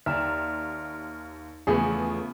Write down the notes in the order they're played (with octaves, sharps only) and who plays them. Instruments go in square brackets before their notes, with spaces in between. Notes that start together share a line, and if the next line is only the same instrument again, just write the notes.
[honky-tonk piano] D#2 A#5 E7 [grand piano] D5 E5 [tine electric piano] F6
[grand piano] E2 A3 [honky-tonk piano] C#3 F3 B3 [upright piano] G#4 [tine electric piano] G#5